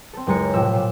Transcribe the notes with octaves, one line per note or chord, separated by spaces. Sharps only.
C4 A4
F#1 C#2 G#3 A#5 C#7
A2 C3 F3 E6 B6
A#2 E7